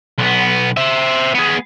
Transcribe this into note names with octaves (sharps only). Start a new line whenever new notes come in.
B1 B3
C5 E5
B3 G#4